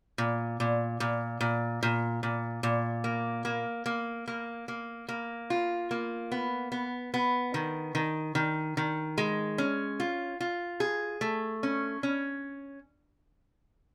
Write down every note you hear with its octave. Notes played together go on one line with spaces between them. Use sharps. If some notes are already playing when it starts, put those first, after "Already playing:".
A#2
A#2
A#2
A#2
A#2
A#2
A#2
A#3
A#3
A#3
A#3
A#3
A#3
F4
A#3
B3
B3
B3
D#3
D#3
D#3
D#3
G#3
C#4
F4
F4
G#4
A3
C#4
C#4